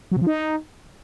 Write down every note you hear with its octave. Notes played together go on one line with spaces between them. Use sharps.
F#3
C3
F3
D#4